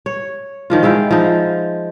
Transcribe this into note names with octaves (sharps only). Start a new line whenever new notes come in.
C#5
D#3 F3 F4
G#3 E4 F5 G5
F3 D#4